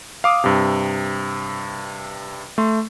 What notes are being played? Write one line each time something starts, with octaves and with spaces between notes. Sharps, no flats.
F5 D6 D#6
G2 C3
A3 C6